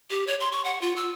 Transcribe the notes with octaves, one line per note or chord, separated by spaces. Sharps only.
G4
C#5
C6
C#6
F#5
F4
E6